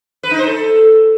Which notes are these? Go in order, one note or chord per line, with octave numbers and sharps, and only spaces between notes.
B4
D#4
C5
A4